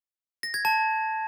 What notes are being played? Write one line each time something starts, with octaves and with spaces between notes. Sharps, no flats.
A#6
G#6
A5